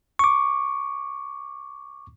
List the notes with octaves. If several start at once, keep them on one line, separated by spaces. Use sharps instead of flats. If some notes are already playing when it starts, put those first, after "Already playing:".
C#6 D6